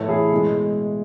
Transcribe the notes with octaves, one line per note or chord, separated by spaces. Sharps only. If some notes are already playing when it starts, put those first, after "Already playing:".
Already playing: A2 E3 A3 A4 C#5
E4 G#4
B2 G#3